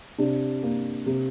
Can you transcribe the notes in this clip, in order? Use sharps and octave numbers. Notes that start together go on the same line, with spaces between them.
C3 D4
A#3
C3